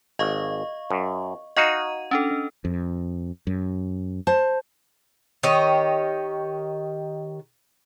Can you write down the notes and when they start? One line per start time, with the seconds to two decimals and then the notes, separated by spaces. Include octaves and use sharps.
0.19 G#1 D#5 F5 C#6
0.91 F#2
1.57 D#4 F#4 D#5 F5 D#7
2.11 C#4 D4 A4
2.65 F2
3.47 F#2
4.27 C5 A5
5.43 D#3 G4 C#5 D#5